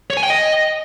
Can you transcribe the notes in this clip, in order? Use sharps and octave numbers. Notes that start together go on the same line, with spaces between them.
C#5
G#5
G5
D#5